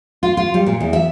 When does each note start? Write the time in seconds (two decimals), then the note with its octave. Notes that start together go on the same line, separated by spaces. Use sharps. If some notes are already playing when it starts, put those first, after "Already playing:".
0.23 F4
0.37 F4
0.54 G3
0.66 A#2
0.80 E2
0.93 E5